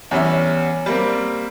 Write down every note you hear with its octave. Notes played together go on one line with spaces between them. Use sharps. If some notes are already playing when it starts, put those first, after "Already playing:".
E2 G3 C#4 E5
G3 A#3 C4